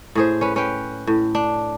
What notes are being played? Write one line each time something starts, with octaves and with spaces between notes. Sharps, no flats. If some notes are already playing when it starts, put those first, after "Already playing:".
A2 G#4 C5
C#4 B4
C#4 B4 G5
A2
D4